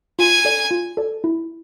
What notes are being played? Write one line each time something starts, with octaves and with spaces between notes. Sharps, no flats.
F4 G#5
A4 D5
F4
A4 D5
E4